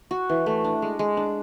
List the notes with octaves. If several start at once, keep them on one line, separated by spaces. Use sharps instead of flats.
F#4
E3
A3
D4
G#3
G#3
D4